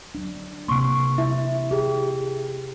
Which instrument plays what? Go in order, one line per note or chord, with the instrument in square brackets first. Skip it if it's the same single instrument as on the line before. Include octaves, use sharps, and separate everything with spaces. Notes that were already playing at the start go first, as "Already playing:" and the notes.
[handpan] F#3 D4
[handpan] C3 A#3 [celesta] C6 C#6
[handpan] E4 [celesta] E5
[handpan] G4 [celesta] G#4